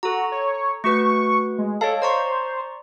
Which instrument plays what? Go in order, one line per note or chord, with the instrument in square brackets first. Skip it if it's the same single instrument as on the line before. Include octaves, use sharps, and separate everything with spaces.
[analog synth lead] F#4 [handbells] A4 A#5
[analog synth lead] C#5
[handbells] A3 F#4 B4 [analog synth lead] C#6
[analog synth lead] G#3
[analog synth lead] A4 [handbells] C#5 D#5 F5
[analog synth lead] C5 [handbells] D5 A#5 C#6